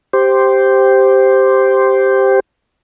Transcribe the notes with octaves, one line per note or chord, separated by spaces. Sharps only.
G4 C5